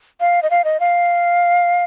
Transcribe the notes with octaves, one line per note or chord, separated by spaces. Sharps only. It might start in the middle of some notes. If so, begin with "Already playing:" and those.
F5
D#5
F5
D#5
F5